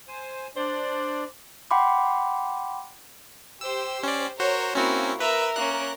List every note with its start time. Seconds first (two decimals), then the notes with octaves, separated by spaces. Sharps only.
0.08 C5 G#5
0.56 D4 C5 D5
1.71 F#5 G5 B5 C6 D6
3.61 G4 C5 E6
4.03 C#4 D5
4.40 F#4 A#4 C5 C#5
4.75 A#3 C4 C#4 E4 F#4 A#4
5.20 A#4 B4 E5
5.56 A#3 C#4 F#6